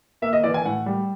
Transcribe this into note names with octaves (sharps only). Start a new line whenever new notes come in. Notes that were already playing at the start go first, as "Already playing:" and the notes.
A#3 E5
D#5
E3 D5
G#5
A2 F#5
G3